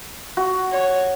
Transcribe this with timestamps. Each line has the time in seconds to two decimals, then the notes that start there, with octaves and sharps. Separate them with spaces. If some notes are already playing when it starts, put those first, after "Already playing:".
0.37 F#4
0.72 C#5